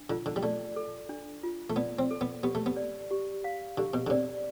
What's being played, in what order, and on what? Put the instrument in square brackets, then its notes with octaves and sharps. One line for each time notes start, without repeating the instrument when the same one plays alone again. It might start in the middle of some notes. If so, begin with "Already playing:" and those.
Already playing: [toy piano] D4
[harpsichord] D3 [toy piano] F4
[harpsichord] D3
G3
[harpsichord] A3 [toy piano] D5
[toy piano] A4
D4
F4
[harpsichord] A3
[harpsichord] B3 [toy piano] D5
[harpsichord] C4
[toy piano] A4
[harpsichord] B3
[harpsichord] B3 [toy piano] G4
[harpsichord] A3
B3
[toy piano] D5
G4
F5
[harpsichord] D3 [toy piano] G4
[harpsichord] B2
D3
[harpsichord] C3 [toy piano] D5